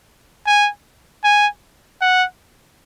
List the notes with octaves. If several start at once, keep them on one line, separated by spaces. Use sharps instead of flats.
G#5
G#5
F#5